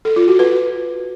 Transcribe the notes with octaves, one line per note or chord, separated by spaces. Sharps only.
A4
F4
F#4
B4